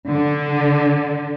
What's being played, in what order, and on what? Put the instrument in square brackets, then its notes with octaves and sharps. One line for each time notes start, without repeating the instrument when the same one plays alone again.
[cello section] D3